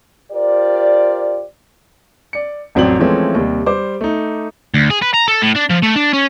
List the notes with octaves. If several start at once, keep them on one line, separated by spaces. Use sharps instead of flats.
F4 G4 A#4 C5 D5
D5 C#7
A1 F2 F#3 C4 D5 F#7
E3 F3 G#3 A3 C4 C#4
D#2 C3 G3
G3 C5 D6
A3 D#4
D2
G#4
B4
A#5
A4
A2
D4
F3
A3
D4
C#4